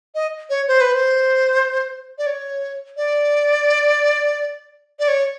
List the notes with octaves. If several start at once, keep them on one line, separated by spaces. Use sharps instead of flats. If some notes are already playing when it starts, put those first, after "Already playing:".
D#5
C#5
C5
B4
C5
D5
C#5
D5
D5
C#5